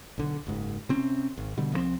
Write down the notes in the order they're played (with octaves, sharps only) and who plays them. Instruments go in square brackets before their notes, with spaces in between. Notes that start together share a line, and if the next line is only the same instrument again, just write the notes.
[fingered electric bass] B1 D3
F#1 G#2
C3 C4 C#4
G#1
B2 D3 G3
C2 F3 F#3 C4